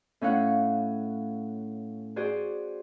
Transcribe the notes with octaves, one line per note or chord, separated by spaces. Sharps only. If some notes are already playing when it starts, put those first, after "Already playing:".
A2 C#4 F5 F#5
F#4 G#4 C5 D5